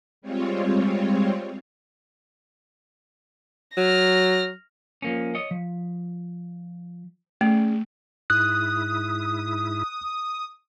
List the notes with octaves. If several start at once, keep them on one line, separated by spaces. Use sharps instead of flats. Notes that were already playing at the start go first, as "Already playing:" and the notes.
G3 G#3 C4 F4 C#5
F#3 F6 A#6
F3 A#3 C#4
C#5 D#5
F3
A3 C#4 G#4 D5
G#2 E4 D#6 F#6